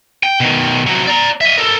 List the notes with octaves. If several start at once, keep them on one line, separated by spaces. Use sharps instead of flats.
G5
B2 D#3
C3 F#3
D5 A#5
D#5 E5
A4 A#4